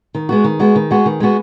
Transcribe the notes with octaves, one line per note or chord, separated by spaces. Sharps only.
D#3
G#3 B3 F#4
D#3
G#3 B3 F#4
D#3
G#3 B3 F#4
D#3
G#3 B3 F#4